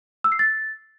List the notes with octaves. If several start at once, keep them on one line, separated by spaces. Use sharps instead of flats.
E6
C7
A6